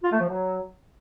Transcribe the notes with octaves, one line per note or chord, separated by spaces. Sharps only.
F4
A3
F3
F#3